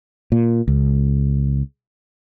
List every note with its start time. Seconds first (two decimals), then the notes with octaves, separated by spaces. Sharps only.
0.32 A#2
0.68 C#2